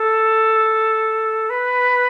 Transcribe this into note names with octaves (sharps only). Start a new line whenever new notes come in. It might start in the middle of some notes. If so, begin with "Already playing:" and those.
Already playing: A4
B4